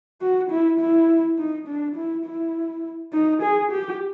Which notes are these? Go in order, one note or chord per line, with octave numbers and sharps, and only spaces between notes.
F#4
E4
E4
D#4
D4
E4
E4
D#4
G#4
G4